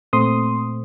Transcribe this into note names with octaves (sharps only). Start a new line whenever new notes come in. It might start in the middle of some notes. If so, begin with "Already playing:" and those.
A#2 A3 C4 C6 D#6